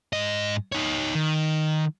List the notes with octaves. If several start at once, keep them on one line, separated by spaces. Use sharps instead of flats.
G#2 D#5
D#4 C#5
D#3